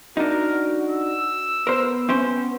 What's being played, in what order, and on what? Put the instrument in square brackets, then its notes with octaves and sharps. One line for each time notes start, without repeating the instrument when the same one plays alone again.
[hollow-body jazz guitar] D4 D#4 [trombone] F#4 [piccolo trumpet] A#4
[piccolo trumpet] E6
[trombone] B3 [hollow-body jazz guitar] A#4 C5
[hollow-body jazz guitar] C4 C#4 C5